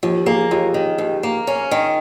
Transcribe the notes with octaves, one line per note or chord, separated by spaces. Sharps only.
D#2 F3
A#3 G#4
D#2 F4
D#3
D#2
A#3
C#4
D#3